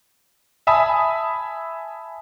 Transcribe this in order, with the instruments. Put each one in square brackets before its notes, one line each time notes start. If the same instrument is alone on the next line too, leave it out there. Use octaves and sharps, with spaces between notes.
[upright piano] E5 G#5 A5 B5 D#6